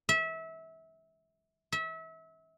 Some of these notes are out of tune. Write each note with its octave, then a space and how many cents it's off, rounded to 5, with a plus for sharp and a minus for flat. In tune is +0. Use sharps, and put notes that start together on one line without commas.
E5 -25
E5 -30